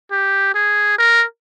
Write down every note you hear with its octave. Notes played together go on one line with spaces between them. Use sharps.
G4
G#4
A#4